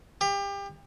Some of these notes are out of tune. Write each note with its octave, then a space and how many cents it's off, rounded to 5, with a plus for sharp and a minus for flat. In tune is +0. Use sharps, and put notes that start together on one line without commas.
G4 +30